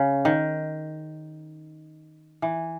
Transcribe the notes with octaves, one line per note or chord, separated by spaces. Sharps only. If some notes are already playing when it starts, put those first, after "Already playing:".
Already playing: C#3
D#3
E3